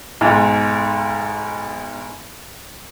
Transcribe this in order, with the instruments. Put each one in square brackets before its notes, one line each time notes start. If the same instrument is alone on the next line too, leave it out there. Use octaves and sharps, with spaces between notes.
[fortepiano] B1 G#2